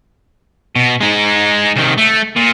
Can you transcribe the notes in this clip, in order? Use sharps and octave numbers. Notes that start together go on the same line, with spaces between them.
B2
G#3 D#4
C2 D#3
A3
A#2